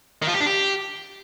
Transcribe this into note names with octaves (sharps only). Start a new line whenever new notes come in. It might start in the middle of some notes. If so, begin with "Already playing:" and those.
D#3
F3
G4
D4
G4